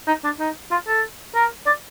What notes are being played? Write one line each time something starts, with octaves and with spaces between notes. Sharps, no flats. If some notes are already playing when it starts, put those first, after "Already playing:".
D#4
D4
D#4
F4
A4
A#4
D5